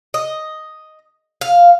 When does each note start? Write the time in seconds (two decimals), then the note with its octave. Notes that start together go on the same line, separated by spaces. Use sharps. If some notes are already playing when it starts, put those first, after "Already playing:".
0.14 D#5
1.41 F5